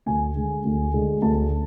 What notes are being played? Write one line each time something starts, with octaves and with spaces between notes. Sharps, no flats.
D2 G#5
D3 G#3
D2
D3 G#3
D2 A5